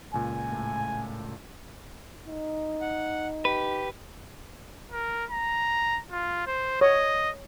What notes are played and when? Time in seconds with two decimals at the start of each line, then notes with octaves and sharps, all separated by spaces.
0.14 C#2 A#2 G#5
0.52 A2
2.28 D#4
2.81 F#5
3.45 G4 B4
4.92 A#4
5.31 A#5
6.11 F4
6.47 C5
6.81 C#5 D#5